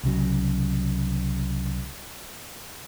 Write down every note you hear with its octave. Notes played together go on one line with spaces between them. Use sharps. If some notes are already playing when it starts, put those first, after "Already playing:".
C2 C#3 F#3